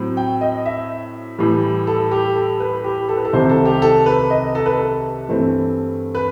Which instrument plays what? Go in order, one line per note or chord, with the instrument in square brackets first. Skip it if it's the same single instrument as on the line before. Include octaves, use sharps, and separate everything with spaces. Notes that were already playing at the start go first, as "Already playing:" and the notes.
Already playing: [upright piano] A2 F#3 C4
G5
D#5
E5
A2 E3 G3
A4
G4
A4
B4
G4
A4
B4
A4
C2 C3 D#3 C5
A4
G4
A4
B4
D#5
A4
B4
A4
G2 E3 A3 C4
B4